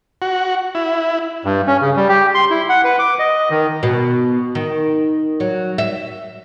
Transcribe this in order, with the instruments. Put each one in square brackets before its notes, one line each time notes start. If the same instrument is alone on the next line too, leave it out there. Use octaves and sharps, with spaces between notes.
[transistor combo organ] F#4
E4
[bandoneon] G2
C#4
C#3
G3
G4
C6
E4
F#5
B4
D6
D#5
D#3
[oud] B2
D#3
F#3
E5